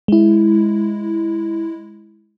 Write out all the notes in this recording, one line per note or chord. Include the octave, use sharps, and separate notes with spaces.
G#3 E4